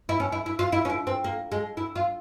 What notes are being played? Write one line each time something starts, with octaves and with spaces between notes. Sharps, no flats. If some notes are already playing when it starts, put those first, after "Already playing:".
E4
C#4
E4
E4
F4
E4
C#4
E4
C4
A#3
G#3
E4
F4